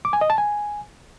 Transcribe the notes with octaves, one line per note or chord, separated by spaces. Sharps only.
D6
G#5
D#5
A5
G#5